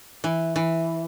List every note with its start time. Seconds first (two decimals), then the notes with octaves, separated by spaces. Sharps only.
0.24 E3
0.56 E3